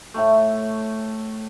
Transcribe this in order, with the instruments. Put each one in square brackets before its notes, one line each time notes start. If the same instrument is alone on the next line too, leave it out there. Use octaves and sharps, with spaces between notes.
[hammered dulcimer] A2 A3